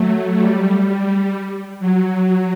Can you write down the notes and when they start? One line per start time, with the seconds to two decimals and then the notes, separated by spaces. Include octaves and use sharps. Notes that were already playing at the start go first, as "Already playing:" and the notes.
Already playing: F#3 A3
0.38 G3
1.79 F#3